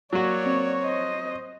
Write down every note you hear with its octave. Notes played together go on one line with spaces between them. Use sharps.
F#3 A#3 F#4 C#5 D5
C4
C5 D#5